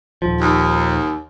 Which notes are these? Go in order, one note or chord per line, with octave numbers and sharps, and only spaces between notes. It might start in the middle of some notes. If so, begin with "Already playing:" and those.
D#1 F3
D#2